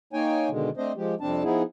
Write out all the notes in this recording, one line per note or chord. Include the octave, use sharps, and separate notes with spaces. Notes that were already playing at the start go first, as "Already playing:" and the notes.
A#3 D#4 C#5 G5 G#5
B2 D3 D#3 G#3
A3 C4 D4 C5 D#5
F3 G#3 G4
F2 C3 G3 C4 D4 A5
F3 B3 D#4 E4 G#4